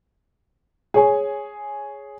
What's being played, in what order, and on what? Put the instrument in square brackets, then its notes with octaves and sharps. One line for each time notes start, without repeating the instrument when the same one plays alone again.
[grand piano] G#4 C#5 G#5